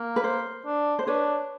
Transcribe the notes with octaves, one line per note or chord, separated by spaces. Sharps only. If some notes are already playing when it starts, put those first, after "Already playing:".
Already playing: A#3
B4
C5
D4
C5
D4 B4 C#5